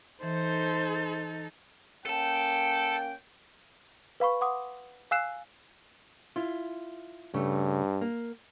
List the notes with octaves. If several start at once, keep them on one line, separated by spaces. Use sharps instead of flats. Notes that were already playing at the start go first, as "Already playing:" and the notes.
E3 D#4 A4 C5
A#3 C#4 A4 G5 A5
B4 F5 B5 C#6
F#5 C6 D6 D#6
F5 G#5 E6 F#6 C7 E7
E4 F4
G2 C#3 A3
A#3